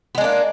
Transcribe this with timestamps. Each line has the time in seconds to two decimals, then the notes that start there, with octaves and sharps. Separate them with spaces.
0.15 B3
0.18 G#3
0.21 D4
0.24 A#3